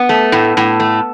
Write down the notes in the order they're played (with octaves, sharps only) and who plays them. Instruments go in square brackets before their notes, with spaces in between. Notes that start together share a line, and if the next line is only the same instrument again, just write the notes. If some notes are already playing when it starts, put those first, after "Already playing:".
Already playing: [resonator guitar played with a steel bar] B3
A3
A2
A2
A3